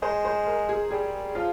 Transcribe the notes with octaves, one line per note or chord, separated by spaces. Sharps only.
G#3 C5
C5
A#4
G#4
G3 G#4
F3 F4